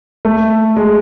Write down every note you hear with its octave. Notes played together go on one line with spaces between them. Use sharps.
A3
G#3